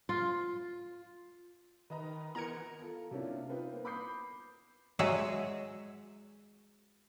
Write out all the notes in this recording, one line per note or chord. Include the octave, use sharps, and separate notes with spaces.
F4
D#3 B4 D#5 A#5
E3 B3 A#4 A#5 G#6 C#7
F4 A4
C3 A#3 C#4 D4 E4 F4
C4 D#4 F4 B4
A#3 B3
B5 D6 D#6 G6 C7
F#3 G#3 F#4 G#4 E5